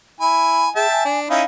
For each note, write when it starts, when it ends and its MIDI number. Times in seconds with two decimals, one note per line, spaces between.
0.21 0.69 64
0.21 0.69 80
0.21 0.69 83
0.76 0.87 68
0.76 1.05 76
0.76 1.05 79
0.76 1.05 81
0.91 1.20 80
1.05 1.29 62
1.29 1.43 61
1.29 1.43 63
1.29 1.43 64
1.29 1.46 77